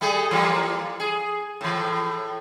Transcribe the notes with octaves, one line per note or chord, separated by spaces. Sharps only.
G3 A3 G#4
E3 G3 A#3
G#4
A2 E3